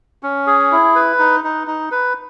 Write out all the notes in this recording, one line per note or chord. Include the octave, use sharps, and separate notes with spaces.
C#4
G#4
E4
B4
D#4
D#4
D#4
B4